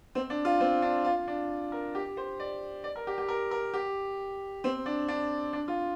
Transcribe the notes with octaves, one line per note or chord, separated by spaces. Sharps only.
C4
D4
F4
C4
D4
F4
D4
A#4
G4
C5
D5
D5
A#4
G4
G4
A#4
A#4
G4
C4
D4
D4
D4
F4